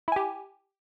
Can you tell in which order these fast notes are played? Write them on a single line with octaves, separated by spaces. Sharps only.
E4 G#5 G4